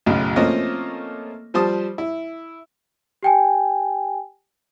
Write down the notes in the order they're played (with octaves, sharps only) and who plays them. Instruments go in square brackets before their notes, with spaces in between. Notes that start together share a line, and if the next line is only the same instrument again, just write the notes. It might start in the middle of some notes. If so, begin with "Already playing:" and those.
[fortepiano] B1 F#2 A2 C#3
F3 A3 A#3 C4 C#4 D#5
F3 G3 C5 A5 D#6
E4
[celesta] G4 G5 G#5